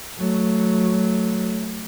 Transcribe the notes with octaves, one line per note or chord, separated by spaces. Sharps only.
F#3 A3